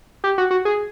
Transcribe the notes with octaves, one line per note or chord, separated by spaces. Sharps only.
G4
F#4
F#4
G#4